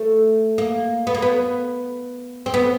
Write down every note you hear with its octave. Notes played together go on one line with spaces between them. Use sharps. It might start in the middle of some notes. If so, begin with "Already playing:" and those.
Already playing: A3
A#3
B3
A#3
B3
C4
B3